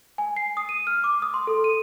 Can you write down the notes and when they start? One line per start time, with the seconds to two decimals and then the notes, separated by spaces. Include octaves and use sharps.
0.18 G#5
0.37 C7
0.57 D#6
0.69 D#7
0.87 F6
1.04 D6
1.22 D#6
1.34 C6
1.47 A4
1.64 D#7